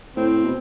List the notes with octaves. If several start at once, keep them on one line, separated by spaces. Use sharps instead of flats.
A2 C4
B2